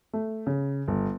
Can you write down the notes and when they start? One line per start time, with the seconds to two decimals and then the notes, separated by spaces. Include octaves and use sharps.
0.13 A3
0.47 C#3
0.88 G1